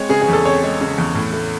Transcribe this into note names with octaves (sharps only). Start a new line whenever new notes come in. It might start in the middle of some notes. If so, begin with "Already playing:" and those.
Already playing: G#3 C4 C#5
C#3 G#4
G#4
E2 A4
C4 C#5
G#3
C#3
E2
A2
A3